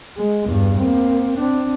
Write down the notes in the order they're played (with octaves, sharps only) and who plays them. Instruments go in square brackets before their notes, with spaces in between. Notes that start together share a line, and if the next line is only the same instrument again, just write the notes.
[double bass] G#3
E2 G2
A#3 C4
C4 D4